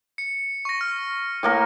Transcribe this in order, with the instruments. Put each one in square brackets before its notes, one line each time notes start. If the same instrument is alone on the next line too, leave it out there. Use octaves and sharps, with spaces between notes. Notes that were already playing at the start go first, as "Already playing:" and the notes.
[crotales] C#7
C#6 A#6
F6
[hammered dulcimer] A2 A#3 A#4